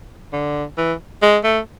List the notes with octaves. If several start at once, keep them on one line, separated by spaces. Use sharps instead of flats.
D3
E3
G#3
A3